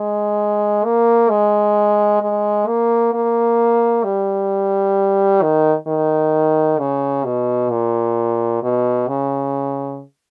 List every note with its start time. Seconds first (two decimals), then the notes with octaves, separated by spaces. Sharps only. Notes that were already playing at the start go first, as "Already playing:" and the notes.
Already playing: G#3
0.84 A#3
1.30 G#3
2.22 G#3
2.67 A#3
3.14 A#3
4.04 G3
5.42 D#3
5.87 D#3
6.79 C#3
7.25 B2
7.70 A#2
8.63 B2
9.08 C#3